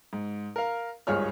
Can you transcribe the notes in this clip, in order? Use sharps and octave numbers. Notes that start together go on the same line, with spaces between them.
G#2
A#4 F5
G#1 C#2 G2 G#4 C#5 F6